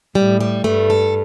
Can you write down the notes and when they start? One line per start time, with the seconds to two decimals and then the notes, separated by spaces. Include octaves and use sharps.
0.15 A2 G3
0.40 G3
0.64 G2 A3
0.90 A4